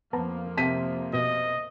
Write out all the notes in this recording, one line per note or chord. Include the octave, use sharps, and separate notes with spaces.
F2 F3 A#3 B3 A5 A#5
C3 A5 B6 D#7
B2 D#5